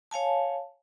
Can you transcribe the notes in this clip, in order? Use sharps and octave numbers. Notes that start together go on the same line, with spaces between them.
C#5 F5 G#5 A5